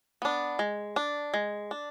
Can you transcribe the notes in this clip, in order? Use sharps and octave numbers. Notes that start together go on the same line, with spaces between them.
B3 D4
G#3
D4
G#3
D4